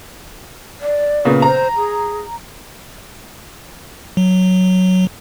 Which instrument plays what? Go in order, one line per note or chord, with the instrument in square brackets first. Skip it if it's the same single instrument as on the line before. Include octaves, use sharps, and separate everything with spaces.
[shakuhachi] D5
[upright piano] A#2 C#3 B3
[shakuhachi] C5 [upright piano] A#5
[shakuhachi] G#4
[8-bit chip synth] F#3